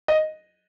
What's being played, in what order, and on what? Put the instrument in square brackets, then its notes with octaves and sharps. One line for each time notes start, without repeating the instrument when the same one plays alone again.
[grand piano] D#5